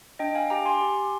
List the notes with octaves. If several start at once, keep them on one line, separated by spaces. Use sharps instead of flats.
D4 D#5 G5
F5 G#5
G4 G5 A#5
G#5 C6
G4